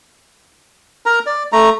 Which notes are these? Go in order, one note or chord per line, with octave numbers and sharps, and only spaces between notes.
A#4 A#5
D5
A3 A#5